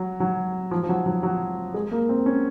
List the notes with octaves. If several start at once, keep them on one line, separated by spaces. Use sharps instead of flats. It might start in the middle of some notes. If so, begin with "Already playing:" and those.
Already playing: F#3
F#3
F3
F3
F#3
F#3
F#3
G#3
A#3
C4
C#4